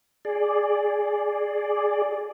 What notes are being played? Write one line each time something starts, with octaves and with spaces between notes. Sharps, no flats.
G#4 D5